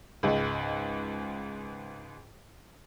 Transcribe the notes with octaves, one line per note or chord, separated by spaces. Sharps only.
C#2 G#2